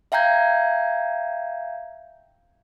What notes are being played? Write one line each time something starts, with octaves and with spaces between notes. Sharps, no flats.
E5 F5 G5 A#5 G6 G#6